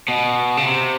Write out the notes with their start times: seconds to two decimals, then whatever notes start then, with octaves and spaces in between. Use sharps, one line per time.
0.08 B2
0.57 C#3
0.67 C3